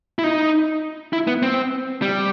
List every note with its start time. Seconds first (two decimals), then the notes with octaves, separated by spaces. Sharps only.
0.19 E4
0.24 D#4
1.13 E4
1.27 B3
1.43 C4
2.02 G3